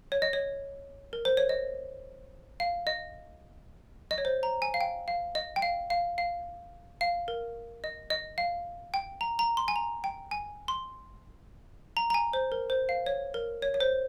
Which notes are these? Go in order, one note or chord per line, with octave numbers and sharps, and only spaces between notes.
C#5
D#5
C#5
A#4
C5
C#5
D#5
F5
D#5
D#5
C#5
C5
A#5
G#5
F5
G5
F5
D#5
G5
F5
F5
F5
F5
A#4
D#5
D#5
F5
G5
A#5
A#5
C6
G#5
A#5
G5
G#5
C6
A#5
A#5
G#5
C5
A#4
C5
F5
C#5
A#4
C#5
C#5
C5